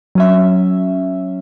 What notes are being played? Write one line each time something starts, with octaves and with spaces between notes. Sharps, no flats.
F#3 C#4 E5